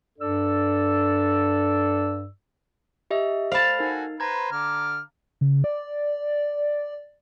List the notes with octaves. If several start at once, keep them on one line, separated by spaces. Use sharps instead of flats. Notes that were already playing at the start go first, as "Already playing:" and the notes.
G2 D4 A4 D5 E6
G4 D#5 E5
C5 F5 A5 B5
D#4 F#4 A4 A#4 G#5
B4 C5 A#5 G#6
D3 D6 F6
C#3
D5